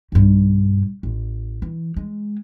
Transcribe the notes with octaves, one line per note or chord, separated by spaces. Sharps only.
B1 G2
A1
E3
G#3